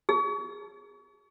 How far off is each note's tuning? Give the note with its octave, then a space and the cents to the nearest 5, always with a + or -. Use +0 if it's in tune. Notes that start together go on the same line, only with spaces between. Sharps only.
G#4 -15